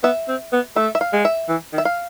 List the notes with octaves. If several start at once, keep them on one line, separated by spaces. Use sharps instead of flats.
B3 E5
C4
B3
A3 E5
E5
F5
G#3
E5
E3
D#3
E5
F5